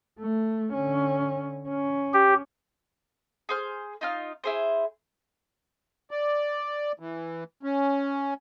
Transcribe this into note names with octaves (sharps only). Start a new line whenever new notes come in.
A3
D3 C#4
C#4
G4
G#4 C5 F6
D#4 F4 F6
E4 G#4 C5
D5
E3
C#4